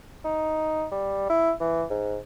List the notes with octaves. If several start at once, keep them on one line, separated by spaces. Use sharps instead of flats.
D#4
G3
E4
E3
G#2